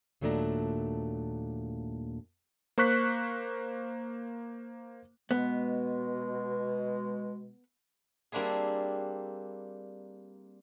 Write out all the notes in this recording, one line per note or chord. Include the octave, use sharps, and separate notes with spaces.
D#2 A#2 F#3 A3 D4 A#5
A#3 C5 C#6 F#6 B6
B2 G#3 B3
G3 A#3 C4 D4 E4 G#4